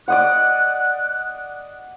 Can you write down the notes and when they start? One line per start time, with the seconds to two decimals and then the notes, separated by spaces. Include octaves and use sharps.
0.08 D5 D#5 F#5 F#6